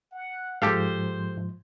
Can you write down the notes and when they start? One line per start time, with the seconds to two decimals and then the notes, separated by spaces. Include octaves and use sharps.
0.12 F#5
0.62 G#2 F3 G4 A4 C5 F5